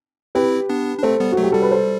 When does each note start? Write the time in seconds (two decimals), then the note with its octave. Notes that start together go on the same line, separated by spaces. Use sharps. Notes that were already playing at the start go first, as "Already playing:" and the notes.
0.35 C4 E4 G4 B4
0.69 B3 D4
0.98 D4
1.03 A3 C4 A4 C5
1.20 G3 B3
1.32 F#4
1.37 F#3 A3
1.43 G4
1.52 G3 A4
1.62 B4
1.71 A4 C5